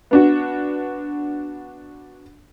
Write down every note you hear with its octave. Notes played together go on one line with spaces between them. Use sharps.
B3 D4 F#4